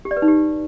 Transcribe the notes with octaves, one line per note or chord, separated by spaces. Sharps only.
G4
D5
B4
D#4
G4